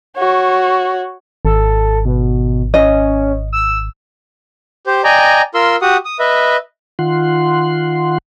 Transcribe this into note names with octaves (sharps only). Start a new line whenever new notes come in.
F#4 C#5
G#1 A4
B2
C#4 D#5
E6
G4 C5
D5 D#5 G5 G#5 A#5
F4 A#4 C6 E6
F#4 G4 F#5 D#6
D#6
B4 D#5 E5
D#3 F4 F#5 C6